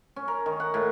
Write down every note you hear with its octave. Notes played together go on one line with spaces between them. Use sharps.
C#4
A#4
D#3
F#5
A2